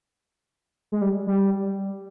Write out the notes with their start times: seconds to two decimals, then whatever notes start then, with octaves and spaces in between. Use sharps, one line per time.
0.92 G#3
1.02 G3
1.27 G3